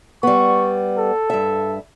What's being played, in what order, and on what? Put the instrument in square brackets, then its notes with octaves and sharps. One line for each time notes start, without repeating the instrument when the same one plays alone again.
[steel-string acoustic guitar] G3 B3 [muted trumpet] C#6
[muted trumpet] A4
[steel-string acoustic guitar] G2 E5